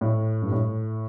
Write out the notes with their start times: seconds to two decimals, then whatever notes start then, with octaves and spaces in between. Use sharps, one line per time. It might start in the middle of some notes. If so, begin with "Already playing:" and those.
0.01 A2
0.42 G2
0.52 A2